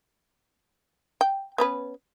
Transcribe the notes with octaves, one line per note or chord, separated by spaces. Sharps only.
G5
B3 C#4 B4